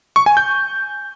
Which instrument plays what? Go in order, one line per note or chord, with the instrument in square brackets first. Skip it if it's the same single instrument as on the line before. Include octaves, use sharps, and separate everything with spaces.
[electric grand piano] C#6
G#5
G6